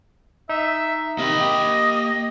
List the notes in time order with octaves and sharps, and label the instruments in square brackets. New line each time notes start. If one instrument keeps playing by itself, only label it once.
[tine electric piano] D#4 [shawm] E5
[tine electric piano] C3 D#3 [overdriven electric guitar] A#3 B5 [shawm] D#5
[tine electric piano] G4